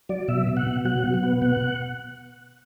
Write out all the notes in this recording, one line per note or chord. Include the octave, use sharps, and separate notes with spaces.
F#3 D5
B2 E5
B2
F#5
B2
F#3 F#5
B2
F#5
B3
B2 F#5